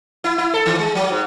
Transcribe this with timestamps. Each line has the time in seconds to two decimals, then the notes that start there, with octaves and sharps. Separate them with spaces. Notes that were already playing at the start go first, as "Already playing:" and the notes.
0.24 E4
0.38 E4
0.54 A4
0.66 D#3
0.79 G#3
0.95 F#3
1.10 G#2